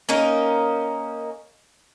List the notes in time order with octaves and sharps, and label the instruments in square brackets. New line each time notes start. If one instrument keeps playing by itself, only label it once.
[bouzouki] A#3 C#4 D#4 A#4